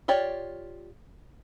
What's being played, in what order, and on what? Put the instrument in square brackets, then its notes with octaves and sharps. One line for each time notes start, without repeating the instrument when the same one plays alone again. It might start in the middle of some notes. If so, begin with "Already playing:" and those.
[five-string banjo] F4 G4 C#5 D5